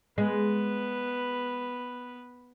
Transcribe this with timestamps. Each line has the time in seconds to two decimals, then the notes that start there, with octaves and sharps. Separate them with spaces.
0.18 G#3 B3 B4